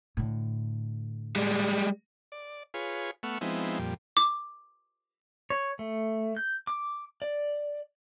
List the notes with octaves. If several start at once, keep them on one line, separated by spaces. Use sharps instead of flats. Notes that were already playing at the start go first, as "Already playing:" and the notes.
A2 D3
G3 G#3
D5
F4 G#4 B4 C#5
A3 B3 F#5 C#6 E6 F6
F3 G#3 B3 C4 D#4 E4
F2 A#2 G3
D6
C#5
A3
G6
D6
D5